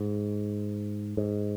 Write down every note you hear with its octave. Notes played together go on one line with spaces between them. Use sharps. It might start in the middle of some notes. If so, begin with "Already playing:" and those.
Already playing: G#2
G#2